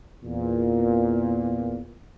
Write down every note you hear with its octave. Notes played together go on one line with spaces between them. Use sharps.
E2 A#2